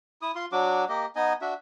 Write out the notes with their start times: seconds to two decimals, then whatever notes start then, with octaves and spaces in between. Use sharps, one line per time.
0.22 E4 D#6
0.35 F4 C6
0.52 F#3 D4 F#4 D6
0.89 A#3 G4 D#5
1.16 B3 D#4 D#5 G#5
1.41 D4 F#4 E5